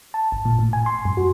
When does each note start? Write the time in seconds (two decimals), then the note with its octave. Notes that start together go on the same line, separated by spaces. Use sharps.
0.14 A5
0.32 G1
0.45 A#2
0.59 A2
0.73 G#5
0.86 C6
1.05 F#2
1.17 F#4